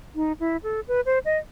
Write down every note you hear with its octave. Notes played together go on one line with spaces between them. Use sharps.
D#4
E4
A4
B4
C5
D#5